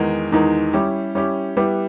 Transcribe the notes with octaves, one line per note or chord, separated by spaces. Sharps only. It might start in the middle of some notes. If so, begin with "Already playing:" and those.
Already playing: E2 D#3 G#3 D#4 A#4
E2 D#3 G#3 D#4 A#4
G3 C#4 E4 G4
G3 C#4 E4 G4
G3 B3 E4 G4 B4